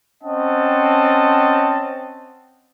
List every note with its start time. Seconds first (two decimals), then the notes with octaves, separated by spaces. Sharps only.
0.23 C4 C#4 D#5 F#5 A5